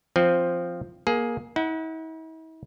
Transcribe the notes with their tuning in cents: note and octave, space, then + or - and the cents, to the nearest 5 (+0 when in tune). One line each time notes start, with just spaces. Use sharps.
F3 +0 C4 +0
A#3 +20 G#4 +15
E4 -45 F#5 +0